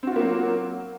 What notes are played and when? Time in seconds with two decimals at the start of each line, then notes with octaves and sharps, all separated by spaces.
0.03 C4
0.07 F#4
0.12 F4
0.16 A#3
0.20 F#3